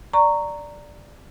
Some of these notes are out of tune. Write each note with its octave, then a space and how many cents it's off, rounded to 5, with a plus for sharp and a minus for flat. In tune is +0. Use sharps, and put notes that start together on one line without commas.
D5 +0 A#5 -10 C#6 +0